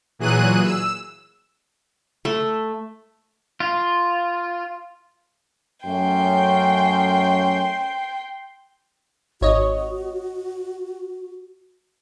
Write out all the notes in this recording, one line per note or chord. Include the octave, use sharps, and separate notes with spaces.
A#2 E3 F#3 G#4 F#6 D#7
E6
A3
F4
F#2 A3 C#4 G5 C6
G#1 F#4 C#5 D#5